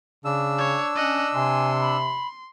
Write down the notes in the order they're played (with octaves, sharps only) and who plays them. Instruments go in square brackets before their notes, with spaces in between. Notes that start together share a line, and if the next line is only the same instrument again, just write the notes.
[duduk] C#3 [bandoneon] D4 E6
[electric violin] C#5
[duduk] C#4 [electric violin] D#5 F#5
[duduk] C3 [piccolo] G#5 [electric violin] C6
[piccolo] B5